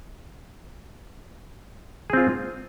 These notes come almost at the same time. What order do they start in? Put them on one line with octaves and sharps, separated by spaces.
G#4 C4 F4